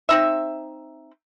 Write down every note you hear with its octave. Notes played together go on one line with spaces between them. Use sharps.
C4 D#4 E5